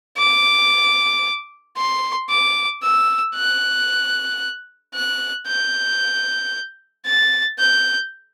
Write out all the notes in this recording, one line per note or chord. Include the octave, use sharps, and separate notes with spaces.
D6
C6
D6
E6
F#6
F#6
G6
A6
G6